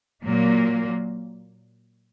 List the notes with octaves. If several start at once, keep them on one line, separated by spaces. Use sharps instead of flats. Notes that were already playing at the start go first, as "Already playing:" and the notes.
A#2 F#3 A#3